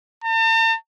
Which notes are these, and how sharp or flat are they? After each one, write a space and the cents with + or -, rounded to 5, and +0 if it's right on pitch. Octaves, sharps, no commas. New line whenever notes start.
A5 +45